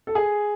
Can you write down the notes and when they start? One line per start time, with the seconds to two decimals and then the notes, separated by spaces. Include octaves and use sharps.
0.07 A4
0.15 G#4